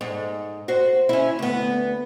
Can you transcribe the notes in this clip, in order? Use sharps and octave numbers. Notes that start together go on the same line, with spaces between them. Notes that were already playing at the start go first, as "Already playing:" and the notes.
G#2
F#4 C5
C#4 E4
D2 B3